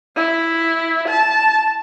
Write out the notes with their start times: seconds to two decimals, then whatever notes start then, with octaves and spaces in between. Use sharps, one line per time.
0.16 E4
1.09 A5